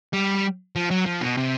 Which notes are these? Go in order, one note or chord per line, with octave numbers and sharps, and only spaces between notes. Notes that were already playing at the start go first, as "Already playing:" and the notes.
G3
F3
F#3
F3
B2
C3